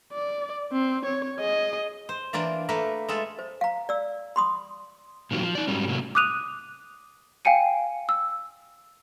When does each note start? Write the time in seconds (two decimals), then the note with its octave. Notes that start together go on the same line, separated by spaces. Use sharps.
0.13 D5
0.73 C4
1.06 C#5
1.39 G#4 D#5
2.09 C5
2.33 E3 A#3 D4 F4 D5
2.69 A3 A#3 A#4 B4
3.09 G#3 F4 A4 E5
3.39 C5
3.61 F5 A#5
3.89 D5 E6
4.36 B5 C6 D#6
5.31 A#2 D#3 F#3 G3 C4
5.42 F3
5.55 D#4 D5
5.68 G#2 F#3 G3 C#4
5.88 A2 C3 F#3 A#3
6.15 D6 D#6 F#6 D#7 F7
7.45 F5 G5 G#5 C#7 D#7
8.09 E6